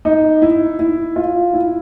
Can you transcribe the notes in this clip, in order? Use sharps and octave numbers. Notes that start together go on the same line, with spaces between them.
D#4
E4
E4
F4
E4